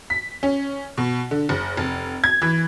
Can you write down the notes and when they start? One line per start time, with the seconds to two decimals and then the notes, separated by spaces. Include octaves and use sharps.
0.10 B6
0.43 C#4
0.98 B2
1.31 D3
1.49 F#1
1.77 F1
2.24 G#6
2.42 E3